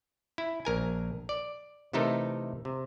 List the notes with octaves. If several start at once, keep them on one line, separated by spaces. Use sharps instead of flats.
E4
A#1 A#4 G#5
D5
C3 E3 A3 D#4 A4 A#4
C3